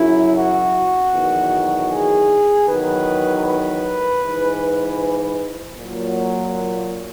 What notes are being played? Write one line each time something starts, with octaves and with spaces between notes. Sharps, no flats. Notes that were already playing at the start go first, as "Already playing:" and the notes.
Already playing: F#2 C#3 F#3 E4
F#4
E2 D#3 F#3
G#4
E2 D#3 F#3 B4
B4
G#2 E3
A#2 F#3